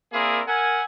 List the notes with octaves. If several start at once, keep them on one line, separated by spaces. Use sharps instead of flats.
A#3 C4 E4 G#4 A#4 D5
A#4 E5 F#5 G#5